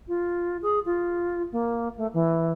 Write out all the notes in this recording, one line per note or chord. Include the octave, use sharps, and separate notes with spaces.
F4
G#4
F4
A#3
A3
E3